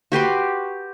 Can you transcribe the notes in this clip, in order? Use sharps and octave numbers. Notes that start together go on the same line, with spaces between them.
F#4 G4 B4 C6